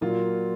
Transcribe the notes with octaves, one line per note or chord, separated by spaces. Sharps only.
A#2 F#3 A#3 F4